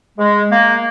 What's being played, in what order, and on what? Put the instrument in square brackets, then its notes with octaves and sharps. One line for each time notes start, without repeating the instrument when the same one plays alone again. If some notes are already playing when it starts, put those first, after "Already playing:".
[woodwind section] G#3
A#3